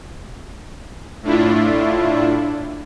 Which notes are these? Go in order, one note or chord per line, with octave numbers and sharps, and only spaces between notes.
A2 A3 D4 E4 F4